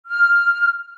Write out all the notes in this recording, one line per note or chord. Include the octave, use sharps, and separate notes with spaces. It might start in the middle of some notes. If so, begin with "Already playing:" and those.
F6